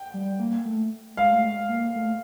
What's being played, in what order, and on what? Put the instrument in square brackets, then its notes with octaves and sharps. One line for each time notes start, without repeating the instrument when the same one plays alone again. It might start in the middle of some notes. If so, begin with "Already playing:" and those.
Already playing: [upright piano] G5
[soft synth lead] G3
A#3
A3
[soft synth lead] G#3 [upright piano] F5
[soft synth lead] A3
G#3
A#3
A3